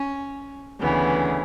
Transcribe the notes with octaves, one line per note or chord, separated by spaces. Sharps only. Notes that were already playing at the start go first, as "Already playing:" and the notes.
Already playing: C#4
D2 C#3 E3 B3